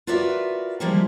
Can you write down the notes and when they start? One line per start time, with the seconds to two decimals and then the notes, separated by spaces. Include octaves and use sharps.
0.07 F4 F#4 A#4 B4 D5 E5
0.80 D#3 F3 G3 G#3 A#3 E4